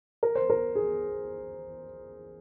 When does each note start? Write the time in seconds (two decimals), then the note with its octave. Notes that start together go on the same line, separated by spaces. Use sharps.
0.23 A#4
0.35 C5
0.50 A#4
0.75 G#4